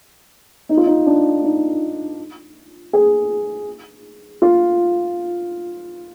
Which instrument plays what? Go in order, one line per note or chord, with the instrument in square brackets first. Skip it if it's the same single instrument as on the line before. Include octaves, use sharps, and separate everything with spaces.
[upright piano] D#4
F4
D#4
D4
D#4
G#4
F4